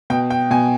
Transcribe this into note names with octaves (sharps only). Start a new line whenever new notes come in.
B2 G5
G5
B2 G#5